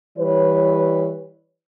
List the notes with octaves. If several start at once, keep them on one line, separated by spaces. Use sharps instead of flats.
E3 G3 B4 C#5